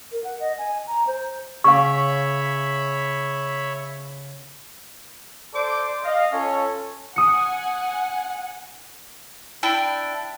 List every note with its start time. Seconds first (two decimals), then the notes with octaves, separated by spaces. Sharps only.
0.12 A#4
0.24 F#5
0.40 D#5
0.58 G#5
0.87 A#5
1.07 C5
1.64 C#3 C#5 E5 F5 B5 C#6
5.53 A4 C5 D5 D6
6.03 D#5 F5
6.32 C#4 F4 A4 C#5
7.16 F#5 G#5 D#6 C#7
9.63 D4 E4 G5